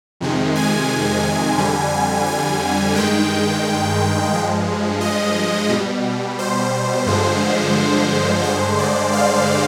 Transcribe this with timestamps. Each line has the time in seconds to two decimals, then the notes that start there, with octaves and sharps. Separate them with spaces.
0.21 F2 C3 D#3 G#3
0.55 G#5
1.58 F2 D3 G3
2.26 G#5
2.95 G2 D#3 G#3 G5
4.33 G2 F3 G#3
5.01 D#5
5.69 B2 G3
6.39 C5
7.06 G2 D3 F3 G#3
8.44 G2 D3 G#3 C5
8.79 D5
9.13 F5